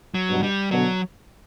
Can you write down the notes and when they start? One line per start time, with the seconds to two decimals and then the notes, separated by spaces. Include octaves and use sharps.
0.14 F#3
0.28 G2 B2
0.43 G3
0.70 B2 D3 F#3